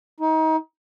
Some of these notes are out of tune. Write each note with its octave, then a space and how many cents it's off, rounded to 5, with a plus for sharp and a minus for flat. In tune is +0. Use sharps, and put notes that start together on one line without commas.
D#4 +30